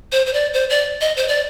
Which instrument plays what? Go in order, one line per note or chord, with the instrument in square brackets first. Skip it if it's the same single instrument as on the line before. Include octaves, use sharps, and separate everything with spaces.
[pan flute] C5
C5
D5
C5
D5
D#5
C5
D5